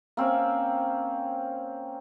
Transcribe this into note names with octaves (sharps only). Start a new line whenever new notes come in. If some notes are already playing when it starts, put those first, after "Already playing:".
A#3 C4 C#4